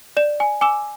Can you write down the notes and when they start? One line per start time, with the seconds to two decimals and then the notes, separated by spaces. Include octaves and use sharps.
0.17 D5 E7
0.40 G#5
0.61 G#5 D6 E6 E7